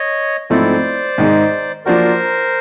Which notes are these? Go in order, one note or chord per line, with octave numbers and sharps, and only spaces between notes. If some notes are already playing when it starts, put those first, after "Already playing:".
Already playing: C#5 D#5
G#2 F3 A3 C4 E4 C5 D5
G#2 D#3 G#3
F3 A#3 D4 F#4 A#4 C5